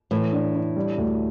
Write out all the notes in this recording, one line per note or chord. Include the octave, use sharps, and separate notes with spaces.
A2 E3
D4
D4
G3
D2